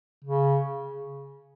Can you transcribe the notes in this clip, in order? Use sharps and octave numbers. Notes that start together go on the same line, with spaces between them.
C#3